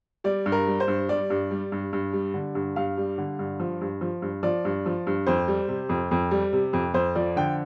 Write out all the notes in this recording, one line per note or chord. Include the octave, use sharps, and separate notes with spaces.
G3 D5
G2
A#4
G3
C5
G2
G3 D5
G2
G3
G2
G2
G3
D3
G2
G2 F5
G3
D3
G2
F3
G2
F3
G2
F3 D5
G2
F3
G2
F2 C5
G3
C3
F2
F2
G3
C3
F2
F2 C5
F3 D5
D3 G5